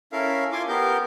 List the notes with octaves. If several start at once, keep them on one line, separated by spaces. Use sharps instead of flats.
C#4 E4 A4 A#4 E5 F5
E4 F4 G#5 C6 D6
B3 G4 A#4 G6